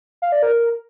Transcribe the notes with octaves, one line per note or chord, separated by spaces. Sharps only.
F5
D5
A#4
A#4